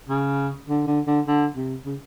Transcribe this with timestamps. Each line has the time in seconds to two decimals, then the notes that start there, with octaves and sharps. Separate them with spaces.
0.09 C#3
0.68 D3
0.87 D3
1.07 D3
1.27 D3
1.56 C3
1.85 C#3